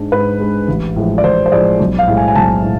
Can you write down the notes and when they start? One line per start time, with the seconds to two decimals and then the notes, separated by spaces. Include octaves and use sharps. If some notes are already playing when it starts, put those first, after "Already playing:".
Already playing: G#2 G#3 D4
0.12 G#2 B4
0.40 G#3 D4
0.68 A1
0.96 A2 F3 G#3
1.18 D5
1.23 A1 C5
1.46 C5
1.52 A2 F3 G#3 D5
1.80 B1
1.98 F5
2.08 A2 G#3
2.17 G#5
2.28 G#5
2.35 B1 A5
2.64 A2